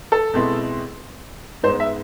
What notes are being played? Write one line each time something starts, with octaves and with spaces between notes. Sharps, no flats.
A4
B2 G#3 C4 E4
G#2 G#3 B3 C5
E5